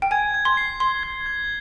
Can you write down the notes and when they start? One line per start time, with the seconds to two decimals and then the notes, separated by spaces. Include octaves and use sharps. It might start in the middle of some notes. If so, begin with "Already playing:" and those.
0.02 G5
0.11 G#5 G#6
0.34 G#6
0.45 C6
0.57 C7
0.80 C6 G7
1.03 G#6
1.26 G#6